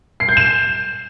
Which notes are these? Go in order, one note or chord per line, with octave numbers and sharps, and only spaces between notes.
C7
G6
E7